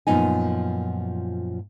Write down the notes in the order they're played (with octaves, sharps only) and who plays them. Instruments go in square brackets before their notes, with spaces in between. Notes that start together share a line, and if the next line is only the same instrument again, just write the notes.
[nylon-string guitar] F#2 A#2 F3 B3 D#4 G#5